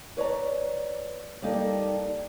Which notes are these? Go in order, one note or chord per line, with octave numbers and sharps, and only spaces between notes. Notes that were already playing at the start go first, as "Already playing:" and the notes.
B4 C#5 D5 A#5
G3 A#3 D#4 G4 A4 D5